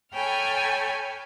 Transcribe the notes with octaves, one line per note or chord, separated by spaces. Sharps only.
A4 C#5 G5 G#5 B5 F6